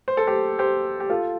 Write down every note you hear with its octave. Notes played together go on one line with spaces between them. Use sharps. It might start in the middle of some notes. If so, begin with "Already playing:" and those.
C5
A4
G4 C5
G4 C5
G4
F4 A4